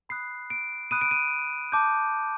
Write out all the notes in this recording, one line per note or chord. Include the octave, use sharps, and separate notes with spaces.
B5 D#6 F#6 C7
D7
B5 D#6 F#6 D#7
D7
D#7
A5 D6 G6